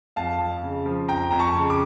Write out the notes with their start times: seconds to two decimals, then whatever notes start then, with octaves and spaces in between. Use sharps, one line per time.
0.16 F2 F5 A5
0.40 F2
0.63 C#3
0.86 F3
1.08 F2 G5 A#5
1.31 F2 A#5
1.39 A5 C#6
1.55 C#3
1.70 D6